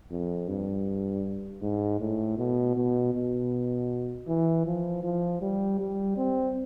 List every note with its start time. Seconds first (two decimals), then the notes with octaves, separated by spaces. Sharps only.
0.11 F2
0.48 G2
1.62 G#2
2.00 A2
2.38 B2
2.76 B2
3.14 B2
4.28 E3
4.66 F3
5.03 F3
5.42 G3
5.79 G3
6.17 C4